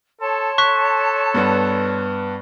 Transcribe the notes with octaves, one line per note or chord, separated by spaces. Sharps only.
A4 C#5 A5 C6
A4 C#6 F#6 B6
G2 B3